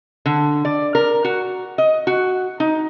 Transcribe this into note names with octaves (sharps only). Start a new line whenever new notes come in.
D3
D5
A#4
F#4
D#5
F#4
D#4